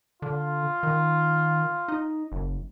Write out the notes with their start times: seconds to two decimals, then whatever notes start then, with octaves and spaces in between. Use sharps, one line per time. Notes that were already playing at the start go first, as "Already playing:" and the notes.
0.22 D3 F4
0.83 D#3
1.88 D#4
2.32 F#1